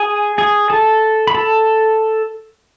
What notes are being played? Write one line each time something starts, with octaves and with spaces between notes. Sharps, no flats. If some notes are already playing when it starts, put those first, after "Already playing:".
Already playing: G#4 G#5
G#4 G#5
A4 A5
B5
A4 A5